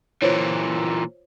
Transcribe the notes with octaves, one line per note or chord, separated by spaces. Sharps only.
A#2 E3 F4 C5 C#5